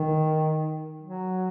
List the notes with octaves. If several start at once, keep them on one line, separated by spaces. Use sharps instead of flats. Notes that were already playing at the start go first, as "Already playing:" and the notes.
Already playing: D#3
F#3